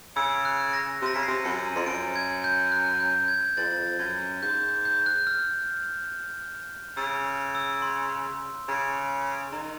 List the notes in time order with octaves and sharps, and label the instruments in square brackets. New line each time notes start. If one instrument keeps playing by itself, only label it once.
[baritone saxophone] C#3 [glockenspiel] E6
[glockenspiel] F#6
A#6
[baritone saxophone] C3 [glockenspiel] A#6
[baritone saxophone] C#3 [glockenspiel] B6
[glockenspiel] C7
[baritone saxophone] C3
[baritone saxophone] F#2 [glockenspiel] C#7
[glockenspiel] D#7
[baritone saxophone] F2
[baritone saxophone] F#2 [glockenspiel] D7
[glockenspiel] G#6
G6
F#6
G6
G#6
[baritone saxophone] F2 [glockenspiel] A6
[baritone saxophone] F#2 [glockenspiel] G#6
[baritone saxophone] G#2 [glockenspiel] G6
[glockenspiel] G6
F#6
F6
[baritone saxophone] C#3 [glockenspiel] E6
[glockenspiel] E6
C6
[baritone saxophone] C#3
[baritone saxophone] D#3 [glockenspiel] A#5